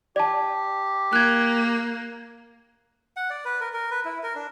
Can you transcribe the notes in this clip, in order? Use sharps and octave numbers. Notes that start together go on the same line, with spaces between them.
G4 D5 A5
A#3 F#6 G#6
F#5
D5
B4
A#4
A#4
B4
E4
A#4
D4